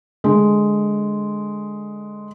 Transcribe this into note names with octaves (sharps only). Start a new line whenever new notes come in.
D3 G#3